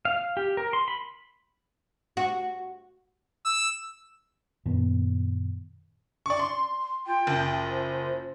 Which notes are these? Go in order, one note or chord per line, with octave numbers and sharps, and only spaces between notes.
F5
G4
A#4
C6
B5
F#4
E6
F#2 A#2 D#3 B3
D5 C#6
C6
F4 G5
F#1
C5